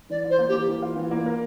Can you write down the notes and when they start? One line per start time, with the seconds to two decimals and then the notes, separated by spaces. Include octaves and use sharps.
0.10 E3 D5
0.24 F4
0.30 C5
0.39 A#3
0.48 G4
0.53 E3
0.68 E3
0.82 F4
0.96 E3
1.11 A#3
1.26 A#4